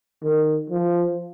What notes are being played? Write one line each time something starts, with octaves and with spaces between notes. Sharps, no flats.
D#3
F3